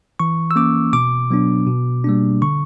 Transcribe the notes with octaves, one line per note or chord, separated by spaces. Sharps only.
E3 C#6
E6
A#3 C#4 D6
B2 D6
F#3 B3 D4
B2
G3 A#3 D4
D3 C#6